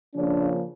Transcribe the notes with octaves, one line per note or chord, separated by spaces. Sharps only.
C#3 F3 A#3 C#4 D4